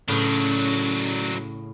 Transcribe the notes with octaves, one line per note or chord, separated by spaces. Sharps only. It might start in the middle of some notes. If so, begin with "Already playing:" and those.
A2 C#3 F#3 D4